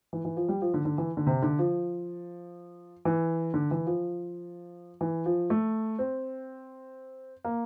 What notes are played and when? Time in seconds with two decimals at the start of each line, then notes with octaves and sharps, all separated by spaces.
0.13 E3
0.25 E3
0.37 F3
0.49 G3
0.62 F3
0.74 D3
0.85 D3
0.98 E3
1.17 D3
1.26 C3
1.42 D3
1.59 F3
3.05 E3
3.54 D3
3.71 E3
3.87 F3
5.01 E3
5.26 F3
5.50 A3
5.99 C4
7.44 A#3